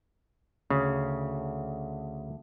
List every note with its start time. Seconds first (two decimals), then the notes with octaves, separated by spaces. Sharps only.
0.70 D2 C#3